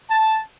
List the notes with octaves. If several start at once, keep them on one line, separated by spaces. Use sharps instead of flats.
A5